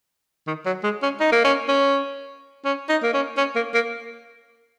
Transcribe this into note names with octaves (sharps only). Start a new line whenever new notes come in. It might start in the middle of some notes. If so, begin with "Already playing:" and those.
D#3
F#3
G#3
C#4
D#4
A#3
C#4
C#4
C#4
D#4
A#3
C#4
C#4
A#3
A#3